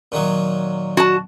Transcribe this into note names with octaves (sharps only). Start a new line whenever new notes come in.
A#2 D#3 F#3
F#4 A5